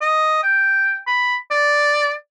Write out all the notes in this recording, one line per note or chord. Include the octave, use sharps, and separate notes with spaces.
D#5
G5
B5
D5